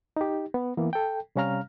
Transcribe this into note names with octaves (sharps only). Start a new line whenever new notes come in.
D#4 G4
B3
E3 A#3 B3
A4 G5
C3 G3 C#4 F5 A#5 F6